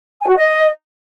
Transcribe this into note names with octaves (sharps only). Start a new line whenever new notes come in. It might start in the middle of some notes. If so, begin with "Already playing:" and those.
G#5
F#4
D#5